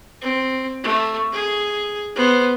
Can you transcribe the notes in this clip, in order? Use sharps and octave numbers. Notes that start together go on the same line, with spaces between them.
C4
A3
G#4
B3 C5